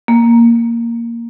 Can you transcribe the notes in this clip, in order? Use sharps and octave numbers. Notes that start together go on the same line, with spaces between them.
A#3